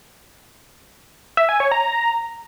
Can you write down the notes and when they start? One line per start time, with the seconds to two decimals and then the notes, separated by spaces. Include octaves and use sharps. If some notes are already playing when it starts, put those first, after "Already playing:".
1.37 E5
1.49 G#5
1.60 C#5
1.71 A#5